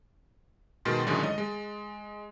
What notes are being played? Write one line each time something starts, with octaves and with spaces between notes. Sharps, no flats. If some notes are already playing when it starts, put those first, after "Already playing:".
B2 D#3 G#3 C6 A6
F#2 A2 D3 D#3 G#3
D#5
G#3